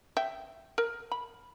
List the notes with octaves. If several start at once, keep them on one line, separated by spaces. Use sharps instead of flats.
E5 G5
A#4
B5